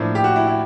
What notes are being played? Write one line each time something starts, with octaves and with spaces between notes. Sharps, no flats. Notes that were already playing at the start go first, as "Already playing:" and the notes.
Already playing: A2 F3 A#3 D4
G4
F#4
E4
E4